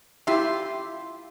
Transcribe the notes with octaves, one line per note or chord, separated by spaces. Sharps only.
E4 F4 G4 E5 C6